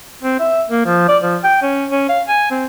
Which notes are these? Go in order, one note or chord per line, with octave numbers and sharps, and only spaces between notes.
C4
E5
A#3
F3
D5
F3
G5
C#4
C#4
F5
G#5
C4